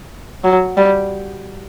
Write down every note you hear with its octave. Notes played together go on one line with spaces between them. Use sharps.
F#3
G3